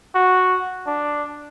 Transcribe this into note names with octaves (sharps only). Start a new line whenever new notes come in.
F#4
D4